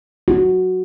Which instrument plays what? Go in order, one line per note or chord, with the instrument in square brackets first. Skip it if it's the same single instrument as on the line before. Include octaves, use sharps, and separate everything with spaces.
[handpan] F#4